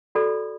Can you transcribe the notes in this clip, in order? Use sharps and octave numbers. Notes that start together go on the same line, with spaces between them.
F#4 A4 D5 B5